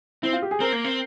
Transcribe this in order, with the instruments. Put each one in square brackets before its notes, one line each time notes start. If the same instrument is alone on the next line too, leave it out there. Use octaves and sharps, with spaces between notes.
[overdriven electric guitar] C4 [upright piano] E4
[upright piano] F4
G4
G#4
[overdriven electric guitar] C4 [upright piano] A#4
[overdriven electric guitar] A#3
C4